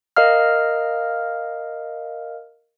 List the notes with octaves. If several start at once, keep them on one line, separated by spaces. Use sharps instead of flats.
A#4 D#5 F5 F6